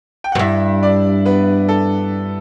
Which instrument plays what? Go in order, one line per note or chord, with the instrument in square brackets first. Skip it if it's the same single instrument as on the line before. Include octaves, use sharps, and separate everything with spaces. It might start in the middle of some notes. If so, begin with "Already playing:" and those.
[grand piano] G5
F#5
[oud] F#2
[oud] G2 [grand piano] E4 E5
[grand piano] D4 D5
B3 B4
A4